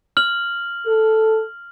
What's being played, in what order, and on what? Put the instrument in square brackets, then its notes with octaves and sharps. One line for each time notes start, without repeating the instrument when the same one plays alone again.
[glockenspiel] F6 F#7
[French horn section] A4